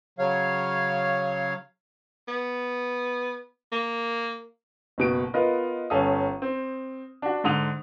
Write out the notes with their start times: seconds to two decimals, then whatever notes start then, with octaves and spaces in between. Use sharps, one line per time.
0.19 C#3 F#3 C#5 F5
2.28 B3
3.72 A#3
4.98 F#1 B2 D7
5.34 B3 F4 A#4 B4 D#5
5.90 G1 C#4 A4 F5 D#6
6.42 C4
7.22 D4 F#4
7.44 G#2 D3 D#6 F7